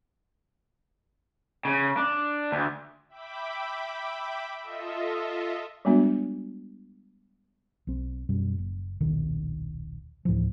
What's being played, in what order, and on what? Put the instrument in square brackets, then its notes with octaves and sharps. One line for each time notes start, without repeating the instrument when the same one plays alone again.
[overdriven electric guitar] C#3
D4
D2
[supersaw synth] E5 G5 B5 D6 B6
F4 A4 D#5 E5
[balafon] G3 G#3 B3 D4 F#4
[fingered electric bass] B1 C4
F#2 B2 G3
F#1
D#1 B1 D#3
D2 A2 E3 F3